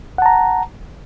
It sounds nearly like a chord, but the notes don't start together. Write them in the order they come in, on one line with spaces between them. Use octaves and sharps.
F#5 A5 A#5